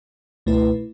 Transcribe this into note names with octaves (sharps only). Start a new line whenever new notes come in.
C#2 B2 A3 E4 B4